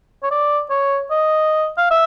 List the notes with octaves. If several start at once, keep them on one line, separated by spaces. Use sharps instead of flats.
C#5
D5
C#5
D#5
F5
E5